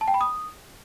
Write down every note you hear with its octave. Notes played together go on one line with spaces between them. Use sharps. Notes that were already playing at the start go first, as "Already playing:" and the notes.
A5
G5
B5
D#6